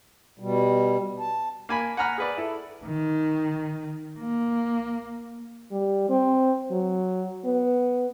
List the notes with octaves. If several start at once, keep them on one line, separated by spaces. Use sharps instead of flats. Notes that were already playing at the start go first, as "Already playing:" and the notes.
B2 G3
A5
A#3 G#5 B5
F#5 G#5 A#5 B5 F6
G#4 B4 D5
E4 A4
D#3
A#3
G3
C4
F#3
B3